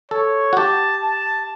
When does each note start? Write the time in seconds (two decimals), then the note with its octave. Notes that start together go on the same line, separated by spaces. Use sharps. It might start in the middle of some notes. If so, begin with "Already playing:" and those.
0.11 A4 C#5
0.53 F#4
0.57 G4 A5
1.03 A5